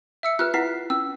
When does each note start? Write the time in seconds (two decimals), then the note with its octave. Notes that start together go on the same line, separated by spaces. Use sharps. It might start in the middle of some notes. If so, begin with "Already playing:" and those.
0.23 E5 E6 C#7
0.39 F4 B4 F6 F#6
0.54 E4 B4 F#5 B6 C7
0.90 C#4 E6